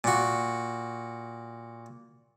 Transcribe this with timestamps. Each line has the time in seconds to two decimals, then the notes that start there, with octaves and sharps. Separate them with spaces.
0.04 A#2 F#4